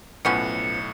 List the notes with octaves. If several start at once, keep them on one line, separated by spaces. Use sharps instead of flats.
B1 A2 F3 B3 C#4 C#7